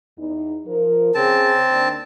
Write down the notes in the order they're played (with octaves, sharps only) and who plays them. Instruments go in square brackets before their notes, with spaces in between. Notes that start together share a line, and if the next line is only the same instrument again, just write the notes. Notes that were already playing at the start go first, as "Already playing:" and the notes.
[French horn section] E2 D#4
F3 A#4
[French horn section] C#3 C#4 G#4 [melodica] C4 A5
[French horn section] D#2 D4